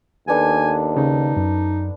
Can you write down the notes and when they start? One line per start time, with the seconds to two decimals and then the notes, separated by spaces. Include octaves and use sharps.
0.28 D#2 B3 D4 A4 G#5
0.97 C#3 D#4
1.37 F#2